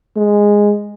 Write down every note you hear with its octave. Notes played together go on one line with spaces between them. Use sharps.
G#3